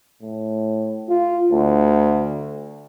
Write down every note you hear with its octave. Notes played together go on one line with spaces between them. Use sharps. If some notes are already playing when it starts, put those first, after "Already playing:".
A2
F4
D2